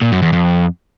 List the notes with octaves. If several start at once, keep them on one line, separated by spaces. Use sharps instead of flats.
A#2
F#2
E2
F2